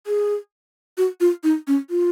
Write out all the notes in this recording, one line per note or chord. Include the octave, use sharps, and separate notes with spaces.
G#4
F#4
F4
D#4
C#4
F4